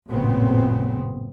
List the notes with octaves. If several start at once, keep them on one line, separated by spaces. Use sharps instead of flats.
A1 F#2 A#2 C#3 B3 C4